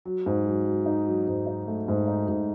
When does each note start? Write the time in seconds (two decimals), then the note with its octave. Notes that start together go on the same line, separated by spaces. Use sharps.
0.05 F#3
0.26 G#2
0.46 F#3
0.66 F#3
0.86 D#4
1.07 F#3
1.27 G#2
1.47 D#4
1.67 A3
1.88 G#2
2.07 D#4
2.28 G#2